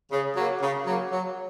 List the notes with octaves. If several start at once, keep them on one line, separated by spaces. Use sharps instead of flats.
C#3
F#3 A#3
C#3
F#3 A#3
F#3